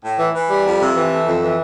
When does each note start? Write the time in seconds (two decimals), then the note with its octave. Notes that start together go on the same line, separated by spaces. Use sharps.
0.05 A2
0.19 E3
0.35 E3
0.50 G3
0.66 F2
0.81 C3
0.96 E3
1.11 A3
1.27 F2
1.42 E3